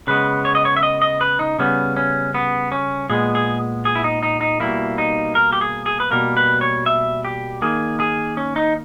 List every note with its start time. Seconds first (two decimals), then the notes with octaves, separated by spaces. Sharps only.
0.07 C#3 G#3 B3 B4
0.45 C#5
0.55 D#5
0.65 C#5
0.77 E5
0.83 D#5
1.02 D#5
1.21 B4
1.39 D#4
1.59 C#3 G3 B3 C#4
1.97 C#4
2.34 B3
2.72 C#4
3.10 A#2 G#3 B3 G#4
3.35 G#4
3.85 G#4
3.95 E4
4.04 D#4
4.23 D#4
4.41 D#4
4.60 B2 G3 A#3 E4
4.98 D#4
5.35 A#4
5.53 G4
5.61 G#4
5.86 G#4
6.00 B4
6.11 B2 G3 A#3 A#4
6.37 B4
6.61 C#5
6.86 E5
7.25 G4
7.62 D#3 A#3 G#4
8.00 G#4
8.37 C#4
8.56 D#4